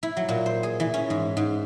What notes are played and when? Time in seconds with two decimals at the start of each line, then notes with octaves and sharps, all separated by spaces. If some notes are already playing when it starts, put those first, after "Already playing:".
0.03 E4
0.17 F#3
0.29 A#2
0.46 C5
0.63 G#4
0.80 E3
0.94 C#4
1.10 G#2
1.37 G#2